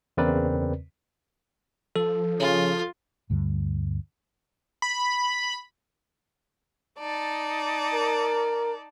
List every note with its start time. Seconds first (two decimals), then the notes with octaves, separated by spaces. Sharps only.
0.17 E2 C#3 C4 A#4 B4 D5
1.96 F3 A4
2.40 C#3 F4
3.30 D2 G2 D3 G3
4.82 B5
6.98 D#4 D5 A5
7.94 A#4